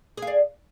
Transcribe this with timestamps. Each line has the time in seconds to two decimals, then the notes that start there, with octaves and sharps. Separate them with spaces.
0.17 G#4
0.22 F5
0.27 D5